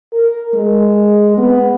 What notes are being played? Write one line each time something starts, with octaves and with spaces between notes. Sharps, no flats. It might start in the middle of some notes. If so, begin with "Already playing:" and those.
A#4
G#3
B3